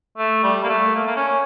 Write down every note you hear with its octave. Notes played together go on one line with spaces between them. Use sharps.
A3
G3
A#3
A3
A#3
A#3
C#4